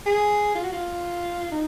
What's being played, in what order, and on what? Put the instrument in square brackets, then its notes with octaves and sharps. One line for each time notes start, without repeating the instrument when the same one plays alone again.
[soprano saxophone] G#4
F4
F#4
F4
D#4